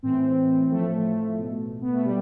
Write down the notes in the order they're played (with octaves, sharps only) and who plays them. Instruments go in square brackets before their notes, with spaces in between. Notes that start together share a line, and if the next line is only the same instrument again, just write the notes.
[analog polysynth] A2 E3 C4
A2 F3 A3
B2
B3
A3
B2 G3